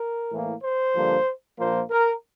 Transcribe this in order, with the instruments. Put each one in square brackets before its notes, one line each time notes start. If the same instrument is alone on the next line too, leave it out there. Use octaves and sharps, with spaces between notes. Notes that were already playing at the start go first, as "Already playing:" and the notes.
Already playing: [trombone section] A#4
A2 E3 A#3
C5
G2 D3 F3 A#3
A#1 A#2 F3 A#3 C5
A#4